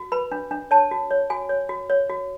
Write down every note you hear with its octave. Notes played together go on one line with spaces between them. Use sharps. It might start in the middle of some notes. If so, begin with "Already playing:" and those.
Already playing: F#4
B4 B5
D4
D4
C#5 A5
F#4
C#5
F#4 G#5
C#5
F#4
C#5
F#4